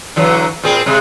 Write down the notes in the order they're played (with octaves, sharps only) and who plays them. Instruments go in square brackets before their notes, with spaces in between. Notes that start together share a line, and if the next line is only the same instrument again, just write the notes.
[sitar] D3 E3 F#3
A#2 C4 G#4
C3 G#3